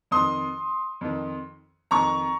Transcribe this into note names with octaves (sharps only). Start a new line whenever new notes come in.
F2 D#3 C6 D#6
F2 D#3
F2 D#3 A#5 C#6